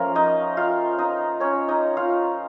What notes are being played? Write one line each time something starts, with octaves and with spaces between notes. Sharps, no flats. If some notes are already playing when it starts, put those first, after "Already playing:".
Already playing: F3 A3 A#3 C#4 F4 A#4
D#4 D#5
F4 F5
D#4 D#5
C#4 C#5
D#4 D#5
F4 F5